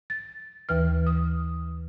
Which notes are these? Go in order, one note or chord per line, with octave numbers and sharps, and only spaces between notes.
A6
D#2 E3 B4 F6
D#6